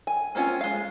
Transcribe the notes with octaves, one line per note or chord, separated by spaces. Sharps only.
G#5
A#3 C4 C#4 F4 G#5
G#3 F5